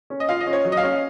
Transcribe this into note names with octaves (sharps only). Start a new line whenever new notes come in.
C#4
D#5
F4 F5
D#5
C#4
C#5
F#3
D#5
F5
C#4